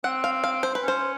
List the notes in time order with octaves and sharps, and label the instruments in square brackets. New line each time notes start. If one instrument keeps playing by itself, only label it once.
[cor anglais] C4 [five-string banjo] F#5
[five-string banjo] F5
F5
C5
B4
[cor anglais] C#4
[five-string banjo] C5